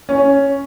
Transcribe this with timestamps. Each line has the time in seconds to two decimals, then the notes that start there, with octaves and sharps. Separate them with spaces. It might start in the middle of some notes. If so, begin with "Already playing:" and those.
0.09 C#4